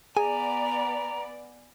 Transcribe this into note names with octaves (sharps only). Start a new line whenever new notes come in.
B3 G#4 D5 G#5 A#5